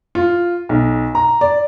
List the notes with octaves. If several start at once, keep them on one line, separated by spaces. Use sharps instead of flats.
F4
B1
A#5
D5